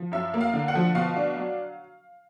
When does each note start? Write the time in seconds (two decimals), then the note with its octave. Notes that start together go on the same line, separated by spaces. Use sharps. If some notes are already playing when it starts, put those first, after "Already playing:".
Already playing: F3
0.12 F#2 E5
0.34 A#3
0.41 F5
0.53 D3
0.68 F#5
0.75 F3
0.95 B2 F5
1.16 D4
1.36 F#3